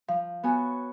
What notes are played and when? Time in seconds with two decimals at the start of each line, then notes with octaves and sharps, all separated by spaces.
0.08 F3 F5
0.43 B3 F#4 C#5 G#5